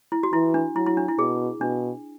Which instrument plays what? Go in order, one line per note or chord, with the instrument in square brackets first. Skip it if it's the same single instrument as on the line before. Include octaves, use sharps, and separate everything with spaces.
[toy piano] E4
F#4
[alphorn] E3 [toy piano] E4
[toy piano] D4
[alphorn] F#3 [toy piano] E4
[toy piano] E4
D4
E4
[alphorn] B2 [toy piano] G#4
[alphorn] B2 [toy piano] D4